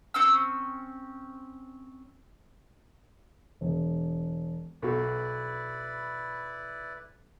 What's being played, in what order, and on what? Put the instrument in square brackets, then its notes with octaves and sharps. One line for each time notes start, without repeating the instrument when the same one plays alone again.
[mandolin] C4 C#4 E6
[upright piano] E1
[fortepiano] B1 F#4 [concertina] E4 B4 D5